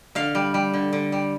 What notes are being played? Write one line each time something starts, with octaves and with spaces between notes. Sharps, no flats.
D3 F5
G3
G3
D3
D3
G3